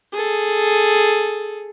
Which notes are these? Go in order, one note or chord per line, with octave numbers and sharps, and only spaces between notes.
G#4 A4